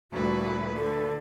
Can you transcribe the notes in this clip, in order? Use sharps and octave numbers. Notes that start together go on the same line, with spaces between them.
D2 A#2 G3 E4 F#4 B4
D3 A4